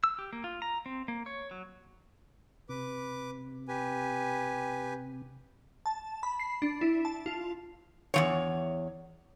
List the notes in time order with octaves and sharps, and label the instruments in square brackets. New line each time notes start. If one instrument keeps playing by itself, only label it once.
[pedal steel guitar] E6
G4
A#3
F4
A#5
C4
A#3
C#5
F#3
[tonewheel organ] C3 [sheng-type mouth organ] B4 D6
[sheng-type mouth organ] G4 B4 G#5
[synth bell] A5
B5
C7
D4
E4
A5
F4
[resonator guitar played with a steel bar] E2 F3 C#5